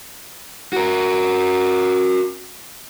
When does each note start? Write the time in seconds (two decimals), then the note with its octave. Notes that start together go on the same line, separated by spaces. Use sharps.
0.73 F#4 A#4